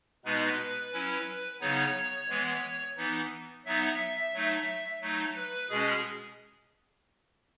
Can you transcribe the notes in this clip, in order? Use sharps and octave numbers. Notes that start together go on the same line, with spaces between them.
B2 G#3 B3 D#4 B4
F#3 C#4 E4
C#3 F#3 B3 D#4 C#5
E3 G#3 B3
E3 B3 D#4
F#3 B3 D#4 E5
F#3 A3 D#4
F#3 A3 D#4
B4
B2 G#3 C#4 G#4